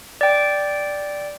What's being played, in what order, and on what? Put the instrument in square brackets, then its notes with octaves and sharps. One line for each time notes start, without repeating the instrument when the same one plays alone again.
[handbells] D5 G5